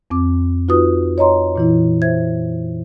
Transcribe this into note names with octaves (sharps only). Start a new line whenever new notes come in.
F2 C4 D6
D#4 F4 F#4 B4 D#6
C#5 D#5 A#5 C6
A#2 E3 E4
C5 E5 G#6